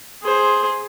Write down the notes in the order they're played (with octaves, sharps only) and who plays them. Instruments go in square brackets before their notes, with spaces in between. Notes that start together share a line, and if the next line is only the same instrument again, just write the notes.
[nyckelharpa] G#4 C5